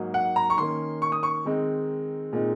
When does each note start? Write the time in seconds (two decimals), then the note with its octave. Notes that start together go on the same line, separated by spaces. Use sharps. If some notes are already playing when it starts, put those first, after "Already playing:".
Already playing: G#2 F#3 A#3 D#4
0.14 F#5
0.36 A#5
0.50 C#6
0.58 D#3 A#3 C#4 C6
1.02 C#6
1.12 D#6
1.23 C#6
1.45 D#3 G#3 C4 D#4
2.33 A#2 G#3 C4 D#4